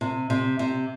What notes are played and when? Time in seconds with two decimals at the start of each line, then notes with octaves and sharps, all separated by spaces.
0.01 C3
0.30 C3
0.59 C3